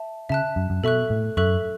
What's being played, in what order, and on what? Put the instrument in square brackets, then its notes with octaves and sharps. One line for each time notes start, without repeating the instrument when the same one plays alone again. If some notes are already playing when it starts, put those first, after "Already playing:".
Already playing: [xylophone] E5 A5
[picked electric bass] C#3 [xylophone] E5 A5 F#6
[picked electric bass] F#2
F#2
[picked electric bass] B2 [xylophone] A4 E5 C#6 F#6
[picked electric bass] A2
[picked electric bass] F#2 [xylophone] A4 E5 C#6 F#6